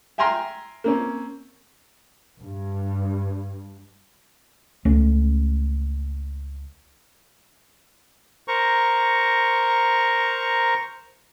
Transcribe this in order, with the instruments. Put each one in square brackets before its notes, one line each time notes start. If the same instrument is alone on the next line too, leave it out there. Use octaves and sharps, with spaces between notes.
[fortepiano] E5 G5 G#5 A#5 C6 F6
A#3 C4 C#4
[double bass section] G2
[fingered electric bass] C#2 A3 C#4
[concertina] A#4 C5 A#5 C#6